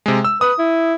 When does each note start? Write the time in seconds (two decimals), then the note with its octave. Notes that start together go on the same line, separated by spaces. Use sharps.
0.06 C3 G#3
0.24 E6
0.41 B4 D#6
0.59 E4